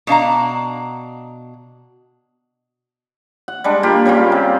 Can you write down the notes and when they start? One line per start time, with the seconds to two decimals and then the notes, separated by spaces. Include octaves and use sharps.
0.07 B2 D4 F5 A#5
3.48 F#5
3.64 G3 G#3 D4
3.83 A#3 F4 G4
4.05 C#3 G3 A#3 F4
4.32 C3